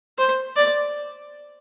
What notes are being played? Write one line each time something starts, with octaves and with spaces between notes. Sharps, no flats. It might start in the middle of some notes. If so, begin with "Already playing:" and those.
C5
D5